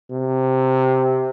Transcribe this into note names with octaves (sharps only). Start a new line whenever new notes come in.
C3